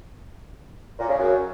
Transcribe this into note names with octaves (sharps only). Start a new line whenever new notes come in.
A#2
C#3
F#2